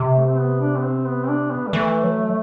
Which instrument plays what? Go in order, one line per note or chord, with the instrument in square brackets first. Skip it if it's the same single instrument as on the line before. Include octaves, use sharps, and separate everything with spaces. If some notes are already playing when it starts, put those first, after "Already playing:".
Already playing: [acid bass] C3
[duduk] A3
C4
B3
D4
B3
C4
B3
C4
D4
B3
G3
[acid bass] E3 [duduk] A3
[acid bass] F#3